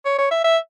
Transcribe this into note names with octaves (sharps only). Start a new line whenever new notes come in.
C#5
C#5
E5
E5